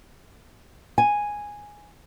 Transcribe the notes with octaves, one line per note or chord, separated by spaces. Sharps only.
G#5